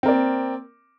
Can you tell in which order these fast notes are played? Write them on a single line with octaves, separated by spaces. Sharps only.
C4 A#4 D5 A#3